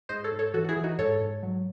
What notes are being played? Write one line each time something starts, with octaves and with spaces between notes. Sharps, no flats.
G#2 C5 D#5
A4 C#5
G#2
A4 C#5
E3 F#4 A4
F#4
E4 G#4
E3
D#4 F#4
G#2 A4 C#5
G#2
F#3